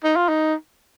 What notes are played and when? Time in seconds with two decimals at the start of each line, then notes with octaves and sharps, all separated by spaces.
0.04 D#4
0.16 F4
0.29 D#4